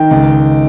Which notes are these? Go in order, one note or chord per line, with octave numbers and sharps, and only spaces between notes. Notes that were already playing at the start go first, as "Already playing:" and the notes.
Already playing: D#3 G5
C#2